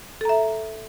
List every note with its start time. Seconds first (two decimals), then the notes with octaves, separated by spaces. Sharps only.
0.21 A4
0.25 A#5
0.29 E5